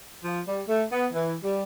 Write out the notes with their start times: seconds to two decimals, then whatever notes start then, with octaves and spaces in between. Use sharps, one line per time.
0.24 F3
0.47 G3
0.69 A3
0.92 B3
1.13 E3
1.43 G3